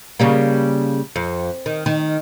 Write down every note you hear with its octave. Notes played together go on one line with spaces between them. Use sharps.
C#3 G3 A#3
F2
D#3
D#3